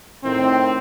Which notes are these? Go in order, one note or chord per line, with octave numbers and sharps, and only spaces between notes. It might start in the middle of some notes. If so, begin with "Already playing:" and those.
A2 D#3 C4